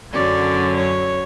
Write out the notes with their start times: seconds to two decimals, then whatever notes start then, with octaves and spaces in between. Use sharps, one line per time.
0.13 F#2 D3 F#3 C#4 D5
0.77 C#5